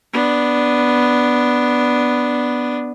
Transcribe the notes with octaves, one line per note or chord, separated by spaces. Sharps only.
B3 D4